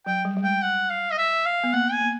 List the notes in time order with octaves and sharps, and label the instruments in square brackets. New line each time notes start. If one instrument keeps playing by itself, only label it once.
[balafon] F#3 [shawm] G5
[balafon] G3
G3
[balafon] G#3 [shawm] G5
[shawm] F#5
F5
D#5
E5
F5
[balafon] B3
[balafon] A#3 [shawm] F#5
[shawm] G#5
[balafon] A#3